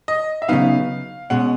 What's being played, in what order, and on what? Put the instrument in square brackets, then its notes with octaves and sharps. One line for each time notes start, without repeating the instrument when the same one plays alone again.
[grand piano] D#5
E5
[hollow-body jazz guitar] C#3 F#3 B3 D#4 [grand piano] F5
[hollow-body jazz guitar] B2 G#3 C#4 [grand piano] F#5